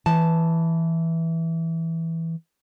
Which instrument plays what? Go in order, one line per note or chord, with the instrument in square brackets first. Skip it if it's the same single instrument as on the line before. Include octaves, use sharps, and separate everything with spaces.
[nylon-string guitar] E3 A5